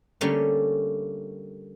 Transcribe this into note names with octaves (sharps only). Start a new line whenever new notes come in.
D3 G3 A3 A#3 C#4